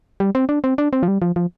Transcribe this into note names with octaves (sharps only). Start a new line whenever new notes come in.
G3
C4
D4
C4
D4
C4
F3
G3
F3
F3